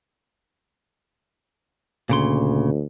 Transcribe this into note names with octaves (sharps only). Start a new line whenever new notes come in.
D2 A#2 C#3 C6